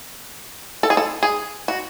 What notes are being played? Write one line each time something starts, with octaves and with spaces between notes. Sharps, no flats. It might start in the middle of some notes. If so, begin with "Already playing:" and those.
A4
G#4
A4
G#4
F#4